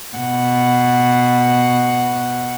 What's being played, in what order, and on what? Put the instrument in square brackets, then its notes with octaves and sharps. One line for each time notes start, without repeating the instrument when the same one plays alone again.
[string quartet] B2 F#5